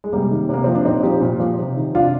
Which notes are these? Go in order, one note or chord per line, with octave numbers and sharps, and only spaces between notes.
G#3
C3 G3 A#3
D#3
C3 A#3
F3 C4
D4
A#2 C4 D#4
F3 D#4 G4
A#2
F3
C3
D#3
C3 D4 F4